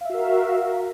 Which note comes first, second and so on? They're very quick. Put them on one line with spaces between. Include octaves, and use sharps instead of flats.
F5 E5 F#4 A#4